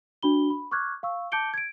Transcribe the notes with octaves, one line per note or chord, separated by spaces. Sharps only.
D4 F#4 B5 G7
B5
C#6 D6 F6 F#6 G#6
F5 C#6 E6
A5 D6 G6 C#7 D7 G7
G#6 D7